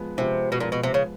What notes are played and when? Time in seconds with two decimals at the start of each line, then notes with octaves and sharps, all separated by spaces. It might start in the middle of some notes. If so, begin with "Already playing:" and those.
Already playing: F3 G#3 B3
0.18 C3 F3 G#3 B3
0.52 B2
0.60 A#2 F3 G#3 B3
0.72 B2
0.83 C3
0.94 C#3